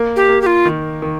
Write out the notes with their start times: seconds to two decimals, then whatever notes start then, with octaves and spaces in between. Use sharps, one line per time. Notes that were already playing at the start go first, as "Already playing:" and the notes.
Already playing: A#3
0.16 G4
0.29 A#3
0.42 G4
0.46 F4
0.65 D#3
1.02 D#3